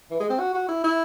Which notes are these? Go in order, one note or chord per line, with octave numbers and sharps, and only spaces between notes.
E3
G#3
C4
F#4
F#4
E4
E4